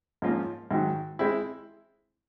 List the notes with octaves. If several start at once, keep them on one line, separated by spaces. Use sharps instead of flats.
G#2 F3 A#3 C#4 F4
G#2 D#3 F#3
G#3 C4 E4